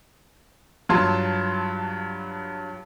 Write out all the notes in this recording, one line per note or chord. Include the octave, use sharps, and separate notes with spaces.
G2 F#3 F4 A5 C6